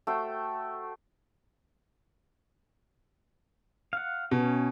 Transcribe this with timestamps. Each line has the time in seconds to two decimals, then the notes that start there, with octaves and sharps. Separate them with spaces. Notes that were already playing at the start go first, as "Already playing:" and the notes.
0.07 A3 F#4 C5 G5
3.93 F5 F#5
4.31 B2 C#4